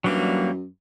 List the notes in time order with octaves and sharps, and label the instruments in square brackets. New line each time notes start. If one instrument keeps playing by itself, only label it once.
[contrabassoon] F#2 [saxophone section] E3 D4 [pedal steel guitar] F#3 G3 A#3